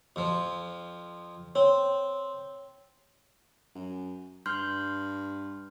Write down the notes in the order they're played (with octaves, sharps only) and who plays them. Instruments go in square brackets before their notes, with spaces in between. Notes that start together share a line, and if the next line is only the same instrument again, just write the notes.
[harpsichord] F2 F3
[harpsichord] C4 [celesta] C#5
[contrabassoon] F#2
[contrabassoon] G2 [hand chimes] C6 F6 G6